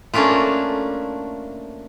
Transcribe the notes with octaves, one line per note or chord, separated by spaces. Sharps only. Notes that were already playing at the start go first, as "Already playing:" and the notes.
A3 A#3 C#4 D4 E4 F4